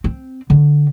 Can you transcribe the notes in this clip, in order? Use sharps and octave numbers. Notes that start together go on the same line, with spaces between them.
C4
D3